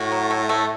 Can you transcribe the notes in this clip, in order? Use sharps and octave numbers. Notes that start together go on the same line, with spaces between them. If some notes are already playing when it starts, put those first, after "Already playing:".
Already playing: A2 F#4
F#3
A3
A3